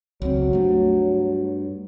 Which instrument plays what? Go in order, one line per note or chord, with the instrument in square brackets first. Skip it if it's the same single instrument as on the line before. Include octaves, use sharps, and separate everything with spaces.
[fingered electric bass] C#2 C4 [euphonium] F#3
[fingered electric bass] G2 A3